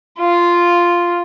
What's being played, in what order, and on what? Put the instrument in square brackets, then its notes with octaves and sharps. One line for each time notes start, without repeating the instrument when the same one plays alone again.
[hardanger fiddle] F4